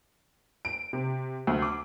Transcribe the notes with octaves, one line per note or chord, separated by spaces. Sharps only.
D7
C3
D2
D6